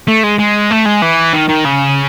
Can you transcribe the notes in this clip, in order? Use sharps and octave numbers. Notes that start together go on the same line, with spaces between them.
A3
G#3
G#3
A3
G#3
E3
D#3
D#3
C#3